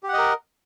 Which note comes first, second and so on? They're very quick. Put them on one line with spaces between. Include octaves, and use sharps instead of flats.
G4 F#5 D#5 A#4